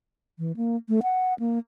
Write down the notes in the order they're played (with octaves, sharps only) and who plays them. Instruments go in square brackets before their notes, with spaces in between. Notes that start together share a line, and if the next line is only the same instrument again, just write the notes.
[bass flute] E3
A#3
A3
F#5
A#3